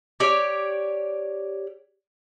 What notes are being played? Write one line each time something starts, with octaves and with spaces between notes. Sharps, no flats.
G4 C#5 D5